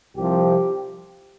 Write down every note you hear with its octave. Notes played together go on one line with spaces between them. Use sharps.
C2 C3 F3 G4